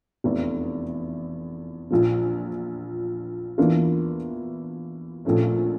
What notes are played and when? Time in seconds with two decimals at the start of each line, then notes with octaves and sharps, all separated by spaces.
0.24 F1 E2 E3
1.90 A#1 A#2 F3
3.58 E2 E3 A#3 D4 F4
5.25 A#1 A#2 F3 A3 C#4